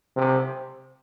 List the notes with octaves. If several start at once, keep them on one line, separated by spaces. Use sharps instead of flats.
C3